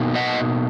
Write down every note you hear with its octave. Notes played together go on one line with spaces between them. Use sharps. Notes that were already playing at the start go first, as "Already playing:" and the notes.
Already playing: B2 A#3 D#4
D#5 F#5